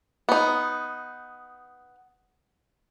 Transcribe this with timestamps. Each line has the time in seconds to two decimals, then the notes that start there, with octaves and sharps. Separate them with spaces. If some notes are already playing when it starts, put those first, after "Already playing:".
0.29 B3 D#4